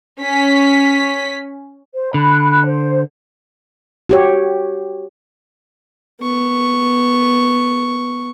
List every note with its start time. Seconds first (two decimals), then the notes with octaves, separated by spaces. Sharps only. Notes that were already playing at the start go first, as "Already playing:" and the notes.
0.22 C#4 B6
1.94 C5
2.14 D3 B5 F#6
2.65 C5
4.09 F#4 G4 C#5
6.21 B3 C#6